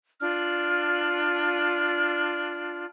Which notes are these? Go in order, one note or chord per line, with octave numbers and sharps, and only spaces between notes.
D4 F4 F6